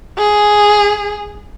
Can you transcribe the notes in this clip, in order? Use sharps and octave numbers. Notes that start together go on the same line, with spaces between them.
G#4